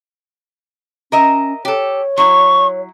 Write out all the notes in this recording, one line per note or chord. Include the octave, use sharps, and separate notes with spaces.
C#4 A#4 D#5 E5
G4 A4 C#5
F#3 E4 C#6